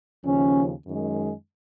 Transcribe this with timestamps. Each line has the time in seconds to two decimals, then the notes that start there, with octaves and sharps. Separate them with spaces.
0.25 D#2 C#3 F3 C#4
0.85 F#2 D#3 G#3